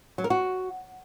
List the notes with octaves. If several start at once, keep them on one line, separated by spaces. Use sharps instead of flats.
F#3
A#4
F#4